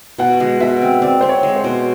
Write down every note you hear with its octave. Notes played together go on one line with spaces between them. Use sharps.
B2 F#5
G#3
B2 E5
C4
C4 D5
C4 C5
C#5
G#3
C5
B2